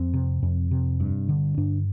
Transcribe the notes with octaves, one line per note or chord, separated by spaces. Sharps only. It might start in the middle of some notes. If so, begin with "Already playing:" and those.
Already playing: F2 C4
C3
F2
C3
G2
D3
G2 D4